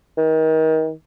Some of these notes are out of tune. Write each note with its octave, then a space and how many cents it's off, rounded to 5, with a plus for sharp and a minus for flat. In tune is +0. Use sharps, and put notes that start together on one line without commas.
D#3 +30